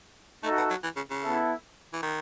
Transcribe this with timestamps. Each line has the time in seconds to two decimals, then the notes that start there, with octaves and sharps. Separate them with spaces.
0.43 A3 D#4 F#4 A4 E5
0.58 B2
0.70 F#3
0.84 E3
0.97 C#3
1.10 C#3
1.24 B3 E4 A4 E5
1.94 E3
2.03 D#3